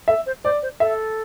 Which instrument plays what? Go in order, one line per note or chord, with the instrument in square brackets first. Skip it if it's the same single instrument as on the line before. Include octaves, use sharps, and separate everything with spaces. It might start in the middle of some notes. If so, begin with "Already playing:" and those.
[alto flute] A4 [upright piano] E5
[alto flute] C5
[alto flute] C5 [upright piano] D5
[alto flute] C5
[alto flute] A4 [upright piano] E5